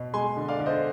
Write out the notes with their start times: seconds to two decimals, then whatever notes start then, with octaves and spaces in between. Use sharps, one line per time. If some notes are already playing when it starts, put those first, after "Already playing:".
Already playing: B2
0.14 G#3 G#5 C6
0.37 D3
0.49 D5 F5
0.60 D3
0.66 C5 D#5